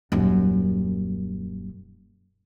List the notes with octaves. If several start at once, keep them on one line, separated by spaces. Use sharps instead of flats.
D#1 F#2